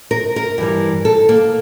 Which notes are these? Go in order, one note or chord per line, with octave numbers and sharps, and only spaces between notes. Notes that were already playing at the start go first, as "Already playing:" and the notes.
A#4
A#4
G2 E3 G3
A4
A#3